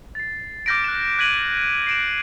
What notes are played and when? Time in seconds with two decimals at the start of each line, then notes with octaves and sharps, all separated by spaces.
0.15 A6 C7
0.66 D6 F6 G6 A#6 B6 D7
0.84 F#6 E7
1.19 F#6 G#6 B6 D#7 F#7
1.87 C7 D7 E7